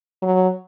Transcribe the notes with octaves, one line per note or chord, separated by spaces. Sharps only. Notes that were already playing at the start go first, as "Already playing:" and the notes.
F#3